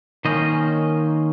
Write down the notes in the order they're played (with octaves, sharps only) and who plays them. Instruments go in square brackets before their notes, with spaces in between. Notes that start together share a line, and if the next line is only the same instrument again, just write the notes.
[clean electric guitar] D#3 A#3 C#4 C5 D#5